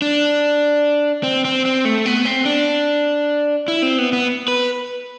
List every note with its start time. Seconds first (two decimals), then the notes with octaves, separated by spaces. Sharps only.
0.02 D4
1.23 C4
1.45 C4
1.65 C4
1.85 A3
2.06 B3
2.25 C4
2.45 D4
3.68 E4
3.82 C4
3.98 B3
4.13 B3
4.48 B4